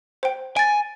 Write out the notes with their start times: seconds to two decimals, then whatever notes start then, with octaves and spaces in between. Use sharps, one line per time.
0.23 C5 G5
0.57 G#5 A6 D7